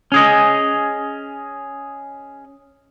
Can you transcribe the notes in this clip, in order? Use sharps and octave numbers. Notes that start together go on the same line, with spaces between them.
C#4 G#4 D#5